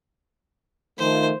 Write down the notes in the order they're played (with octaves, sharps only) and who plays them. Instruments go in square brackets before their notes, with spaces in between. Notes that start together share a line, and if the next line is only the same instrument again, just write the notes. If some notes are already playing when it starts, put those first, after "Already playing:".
[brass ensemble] D#3 F3 A3 [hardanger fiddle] C5